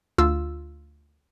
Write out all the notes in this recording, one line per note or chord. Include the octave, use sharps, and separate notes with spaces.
D2 F4 E6